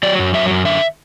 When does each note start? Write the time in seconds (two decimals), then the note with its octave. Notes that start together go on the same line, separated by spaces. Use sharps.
0.03 F#3 D5
0.19 F#2
0.34 F#3 E5
0.51 F#2
0.65 D3 E5